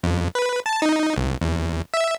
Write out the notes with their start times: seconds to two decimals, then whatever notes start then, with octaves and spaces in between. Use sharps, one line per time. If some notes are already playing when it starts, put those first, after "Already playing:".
0.03 F2
0.35 B4
0.66 A5
0.82 D#4
1.16 C2
1.41 E2
1.94 E5